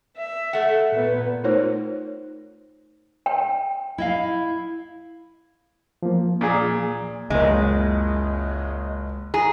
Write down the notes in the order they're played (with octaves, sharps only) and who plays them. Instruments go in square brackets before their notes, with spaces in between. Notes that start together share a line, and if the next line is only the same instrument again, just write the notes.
[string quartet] E5
[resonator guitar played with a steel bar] A3 F#5
[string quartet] A#2 B3
[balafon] A3 D#4 F4 A#4 C5 C#5
[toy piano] G5
[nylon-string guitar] E4 D#5 F5
[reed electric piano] F3 A#3
[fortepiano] A#2 G#4
[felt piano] F#1 A#3 D#5 [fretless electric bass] C#2 [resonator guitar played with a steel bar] G#3
[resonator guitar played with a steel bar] G#4 [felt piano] A#5